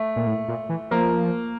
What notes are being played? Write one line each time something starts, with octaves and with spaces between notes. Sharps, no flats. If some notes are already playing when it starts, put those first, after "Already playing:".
Already playing: A3
A#2
A2
A#2
E3
F3 A#3 A#4